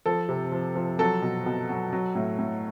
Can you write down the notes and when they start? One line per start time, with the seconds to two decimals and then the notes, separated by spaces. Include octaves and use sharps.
0.06 F3 A4
0.29 C3
0.52 F3
0.76 F3
0.99 F#3 A4
1.22 B2
1.46 B2
1.69 F#3
1.92 F#3
2.15 A2
2.39 A2